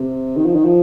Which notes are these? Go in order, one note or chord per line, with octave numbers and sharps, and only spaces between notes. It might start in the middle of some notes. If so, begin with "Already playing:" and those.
Already playing: C3
D#3
F3
D#3
F3